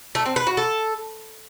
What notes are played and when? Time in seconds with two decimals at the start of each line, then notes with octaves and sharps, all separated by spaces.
0.15 A3
0.26 C4
0.36 B4
0.47 F#4
0.57 A4